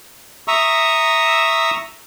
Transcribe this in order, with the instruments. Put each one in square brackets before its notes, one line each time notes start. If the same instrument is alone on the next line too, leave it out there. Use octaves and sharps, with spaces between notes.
[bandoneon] E5 A#5 C#6 D#6 E6